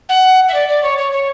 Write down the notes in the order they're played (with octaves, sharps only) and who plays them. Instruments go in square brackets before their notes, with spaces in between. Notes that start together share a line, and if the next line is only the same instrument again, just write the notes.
[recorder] F#5
E5
D5
D5
C#5
C#5
C#5